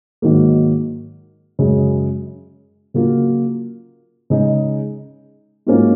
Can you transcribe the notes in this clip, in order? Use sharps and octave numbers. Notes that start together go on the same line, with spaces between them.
G#2 D#3 F#3 A#3
F#2 C#3 G#3
C#3 F#3 A#3 F4
C#3 G#3 D#4
G#2 F#3 A#3 C#4 F4